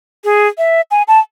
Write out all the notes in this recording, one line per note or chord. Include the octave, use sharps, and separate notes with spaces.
G#4
E5
G#5
A5